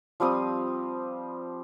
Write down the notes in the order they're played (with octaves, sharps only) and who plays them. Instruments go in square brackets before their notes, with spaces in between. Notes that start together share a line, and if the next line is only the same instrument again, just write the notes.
[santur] F3 G3 C4 D#6